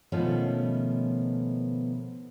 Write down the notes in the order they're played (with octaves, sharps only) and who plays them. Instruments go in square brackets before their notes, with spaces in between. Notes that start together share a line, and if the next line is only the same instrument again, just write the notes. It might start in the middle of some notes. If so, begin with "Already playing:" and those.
[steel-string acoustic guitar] B2 D#3 F3 A3 B3 C#4